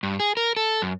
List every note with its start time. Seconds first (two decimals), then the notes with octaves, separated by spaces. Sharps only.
0.03 G2
0.20 G#4
0.37 A#4
0.57 A4
0.82 F#2